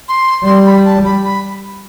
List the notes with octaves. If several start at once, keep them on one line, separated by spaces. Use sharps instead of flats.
C6
G3 C6
B5
A5
B5
B5